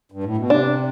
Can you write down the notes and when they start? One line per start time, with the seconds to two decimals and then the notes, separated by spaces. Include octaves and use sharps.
0.12 G2
0.24 A2
0.37 B2
0.50 C3 D4